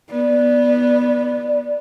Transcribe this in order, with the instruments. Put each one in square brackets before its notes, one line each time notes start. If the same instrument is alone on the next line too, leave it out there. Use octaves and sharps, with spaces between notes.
[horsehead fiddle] B3 [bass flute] D5